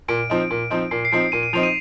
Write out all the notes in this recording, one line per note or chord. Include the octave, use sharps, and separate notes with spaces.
A#2 D7
F3 C4 D#4
A#2
F3 C4 D#4
A#2 C7
C7
F3 C4 D#4 D7
A#2 D#7
D#7
F3 C4 D#4 F7
D#7